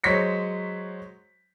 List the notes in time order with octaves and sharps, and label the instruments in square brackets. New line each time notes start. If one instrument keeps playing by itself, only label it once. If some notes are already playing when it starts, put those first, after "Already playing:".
[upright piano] F#3 G#3 C5 C#5 B6 C#7